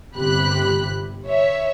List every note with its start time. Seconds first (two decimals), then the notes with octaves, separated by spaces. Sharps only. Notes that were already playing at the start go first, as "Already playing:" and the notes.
0.14 G1 C3 G4 B5 F#6
1.28 C#5 E5